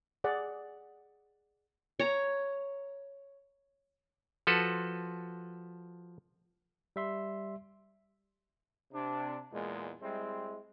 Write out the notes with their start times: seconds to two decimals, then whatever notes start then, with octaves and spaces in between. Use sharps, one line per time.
0.24 G#4 D5 F#5
1.99 C#5 A#5
4.47 F3 F#4 A4 B4
6.96 G3 E5 C6
8.92 C3 D4
9.52 E2 A#2 G#3
10.02 G3 G#3 C4 E4